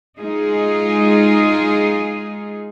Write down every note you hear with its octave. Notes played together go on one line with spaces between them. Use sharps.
G#3 D#4 F4 G#4